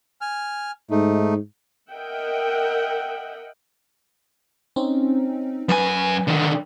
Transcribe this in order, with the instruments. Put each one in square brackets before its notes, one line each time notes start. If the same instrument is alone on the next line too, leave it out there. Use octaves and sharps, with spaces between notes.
[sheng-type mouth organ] G#5 F6
[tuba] G#2 [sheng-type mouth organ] A3 D#4
[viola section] A#4 D#5 E5 F#5 G5
[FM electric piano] C4 C#4 D#4
[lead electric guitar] F#2 G#5 [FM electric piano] B4
[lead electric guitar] D3 D#3